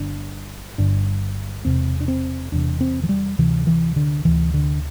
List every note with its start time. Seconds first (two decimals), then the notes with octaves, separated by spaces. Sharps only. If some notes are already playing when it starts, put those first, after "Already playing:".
Already playing: G1 G2 D3 D4
0.78 G1 G2 D3 D4
1.65 E1 E2 C3 C4
2.00 D4
2.08 C4
2.52 E1 E2 C3 D4
2.81 C4
3.03 E3
3.09 G3
3.38 D2 C3 E3
3.67 E3
3.96 D3
4.25 D2 C3 E3
4.54 D3